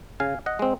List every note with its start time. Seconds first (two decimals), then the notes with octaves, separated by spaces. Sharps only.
0.20 C#3 F5 G#5
0.46 D#5 F#5
0.59 G#3 C4